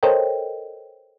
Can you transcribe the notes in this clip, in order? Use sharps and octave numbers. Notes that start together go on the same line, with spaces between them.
A4 A#4 C5 C#5 D#5 G5